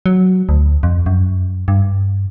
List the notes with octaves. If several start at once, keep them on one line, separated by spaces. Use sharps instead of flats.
F#3
D2
F2
F#2
G2